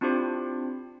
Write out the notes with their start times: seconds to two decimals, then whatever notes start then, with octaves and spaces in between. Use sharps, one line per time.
0.01 C4 D4 E4 F4 G4 C5